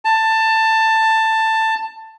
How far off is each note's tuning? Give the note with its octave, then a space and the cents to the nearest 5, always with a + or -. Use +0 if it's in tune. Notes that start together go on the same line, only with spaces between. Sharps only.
A5 +15